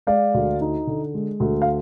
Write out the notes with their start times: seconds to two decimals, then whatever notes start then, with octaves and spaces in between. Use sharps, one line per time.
0.07 G#3 D5 F5
0.34 D2
0.61 D#4
0.87 D3
1.14 G#3
1.40 D2
1.62 F5